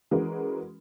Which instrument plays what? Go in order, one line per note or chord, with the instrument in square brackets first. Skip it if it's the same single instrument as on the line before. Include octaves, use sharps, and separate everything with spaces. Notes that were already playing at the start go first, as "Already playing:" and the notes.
[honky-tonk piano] E3 G#3 C#4 F#4 A#4